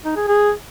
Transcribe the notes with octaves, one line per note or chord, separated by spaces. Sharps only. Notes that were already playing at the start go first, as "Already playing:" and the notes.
D#4
G#4
G#4